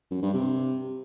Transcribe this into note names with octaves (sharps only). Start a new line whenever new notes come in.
F#2
G2
C3